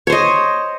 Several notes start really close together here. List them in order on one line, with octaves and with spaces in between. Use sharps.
C#5 C5 D#5